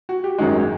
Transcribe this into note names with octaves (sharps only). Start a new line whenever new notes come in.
F#4
G4
G#1 F#2 D#3 G#3 F#4